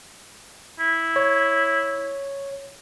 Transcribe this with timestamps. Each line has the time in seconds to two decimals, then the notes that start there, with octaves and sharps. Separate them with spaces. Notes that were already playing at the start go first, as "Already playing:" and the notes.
0.79 E4
1.16 C#5